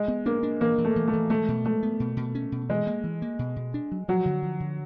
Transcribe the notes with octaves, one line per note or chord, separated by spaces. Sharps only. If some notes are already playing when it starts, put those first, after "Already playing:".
Already playing: G#3
B3
A#3 D4
D4
E3 A#3
E3
A3
E3
A3
E3
G#3 A3
B2
G#3 A3
B3
B2
B2
C#4
B2
E3 G#3
A#3
E3
A#3
B2
B2
D4
F#3
F3 F#3
D3
F3
D3